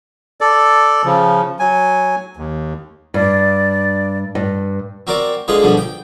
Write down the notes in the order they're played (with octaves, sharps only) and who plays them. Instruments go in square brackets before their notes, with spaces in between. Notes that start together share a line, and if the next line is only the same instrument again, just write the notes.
[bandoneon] A4 D5
C#3 F3
F#3 G#5
D#2
[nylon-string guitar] G2 [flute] D5
[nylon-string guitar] G2
[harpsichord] C4 F#4 A#4 D5
D3 G#3 F4 G#4 B4
G2 B2 D3 F3
G5